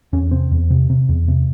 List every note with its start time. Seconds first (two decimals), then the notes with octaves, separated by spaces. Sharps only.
0.13 E2 C#4
0.31 C3 C4
0.51 E2
0.70 C3
0.90 C3
1.09 E2
1.28 C3